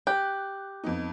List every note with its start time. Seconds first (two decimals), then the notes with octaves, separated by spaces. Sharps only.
0.07 G4 F#6
0.84 F2 B3 D#4